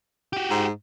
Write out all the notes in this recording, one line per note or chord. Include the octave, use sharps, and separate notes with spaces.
F#4 G4
G#2